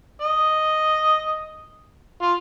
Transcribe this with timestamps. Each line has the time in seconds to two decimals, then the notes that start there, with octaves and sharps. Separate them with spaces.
0.21 D#5
2.22 F4